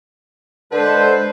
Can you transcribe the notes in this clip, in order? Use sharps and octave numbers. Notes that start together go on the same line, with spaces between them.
D3 G#3 A4 B4 C5